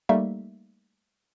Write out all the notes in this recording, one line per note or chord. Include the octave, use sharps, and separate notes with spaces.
G3 A3 A#3 D#4 E5